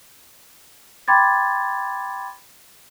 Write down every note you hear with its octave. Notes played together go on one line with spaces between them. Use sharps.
G5 B5 C6 D6 G#6 A6